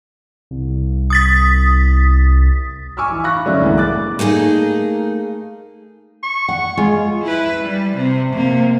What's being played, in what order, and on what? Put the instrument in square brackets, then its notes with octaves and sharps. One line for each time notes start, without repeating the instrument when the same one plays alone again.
[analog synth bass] C2
[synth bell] D#6 A6 B6
[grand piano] G#5 C#6 D6 E6 F6
E3
F5 B5 C#6 F#6 A#6
F#2 D3 C#4 D5 E5
C2 A2 E3 G#3 B3
D6 F#6 A6
[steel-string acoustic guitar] A3 A#3 D#4 G#4
[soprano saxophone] C#6
[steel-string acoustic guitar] F#5
[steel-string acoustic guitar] G#3 [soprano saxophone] F4
[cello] E4 B4
G3
C3
C3 A#3